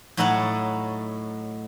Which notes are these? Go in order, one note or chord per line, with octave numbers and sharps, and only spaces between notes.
A2 F#3 D#4 C#5 F#5 A5